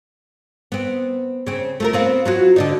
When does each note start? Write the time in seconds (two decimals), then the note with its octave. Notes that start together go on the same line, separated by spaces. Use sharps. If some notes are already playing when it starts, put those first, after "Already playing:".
0.72 B3 C4
1.47 C#3 C4
1.80 A3 F4 A#4
1.93 B3 C4 F5
2.25 F#3 F4 F#4
2.56 D3 D4 D#4